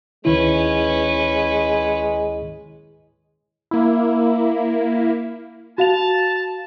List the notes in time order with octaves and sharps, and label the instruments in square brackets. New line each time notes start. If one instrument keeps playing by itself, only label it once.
[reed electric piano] D2 D#3 E4 [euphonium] G#3 [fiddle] C#4 B4
[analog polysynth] A#3 E4
[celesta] F#4 F5 F7 [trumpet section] A5